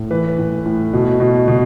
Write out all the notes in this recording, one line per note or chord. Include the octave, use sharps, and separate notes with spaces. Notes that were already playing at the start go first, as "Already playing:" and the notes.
Already playing: A2
E3 B4
A2
A2
B2
B2
B2